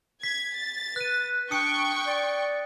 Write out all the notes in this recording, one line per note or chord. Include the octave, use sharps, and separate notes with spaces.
G#6 B6
A6
B4 F#6 D#7
D4 G5 C#6 D#6 C#7
D5